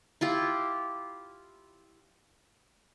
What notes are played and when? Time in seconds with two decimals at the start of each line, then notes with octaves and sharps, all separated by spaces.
0.21 E4 F4 G4